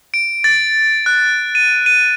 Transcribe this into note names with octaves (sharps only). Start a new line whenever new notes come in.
D7
A6
F#6
D#7
D#7